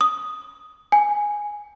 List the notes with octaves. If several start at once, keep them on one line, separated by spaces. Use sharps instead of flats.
D#6
G#5